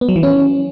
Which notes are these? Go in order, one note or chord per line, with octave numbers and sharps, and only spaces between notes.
B3
F#3
E3
C#4